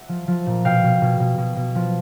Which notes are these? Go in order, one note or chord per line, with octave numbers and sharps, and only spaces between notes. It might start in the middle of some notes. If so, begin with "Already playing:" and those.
Already playing: E5 F#5
F3
F3
A#2
B2 F5 G5
B2
B2
B2
B2
B2
F3